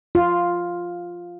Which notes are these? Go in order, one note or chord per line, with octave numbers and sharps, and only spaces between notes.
F4